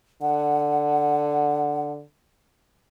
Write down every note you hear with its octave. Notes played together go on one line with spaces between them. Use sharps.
D3 F#5